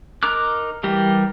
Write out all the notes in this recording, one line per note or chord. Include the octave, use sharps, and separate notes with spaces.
D#4 A#4 A#5 D6 F#6
E3 G3 G4 A#4